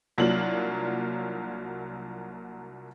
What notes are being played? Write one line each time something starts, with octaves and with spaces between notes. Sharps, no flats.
C2 F#3 A#3 D4 F4 F#7